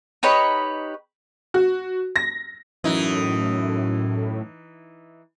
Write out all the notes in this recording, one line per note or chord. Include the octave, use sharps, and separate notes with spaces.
D#4 G4 B4 C#5
F#4
A#6
F#2 A2 E3 D#4